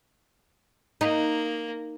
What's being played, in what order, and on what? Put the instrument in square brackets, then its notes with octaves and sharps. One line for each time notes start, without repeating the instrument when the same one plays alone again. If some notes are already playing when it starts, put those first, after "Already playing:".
[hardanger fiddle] A#3 [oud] D#4